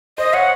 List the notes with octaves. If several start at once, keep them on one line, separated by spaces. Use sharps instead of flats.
C5 D#5
C#5 F#5